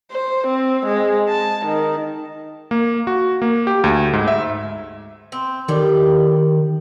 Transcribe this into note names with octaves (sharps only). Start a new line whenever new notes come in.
C5
C4
G#3
A5
D#3
A#3
F#4
A#3
G4
D2
G#2
E5
C4
A2 D#3 G3 G4